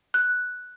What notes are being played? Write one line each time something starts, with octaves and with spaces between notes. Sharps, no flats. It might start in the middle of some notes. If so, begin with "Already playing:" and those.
F#6